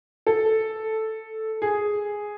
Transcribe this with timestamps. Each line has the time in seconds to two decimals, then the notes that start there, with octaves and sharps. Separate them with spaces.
0.27 A4
1.62 G#4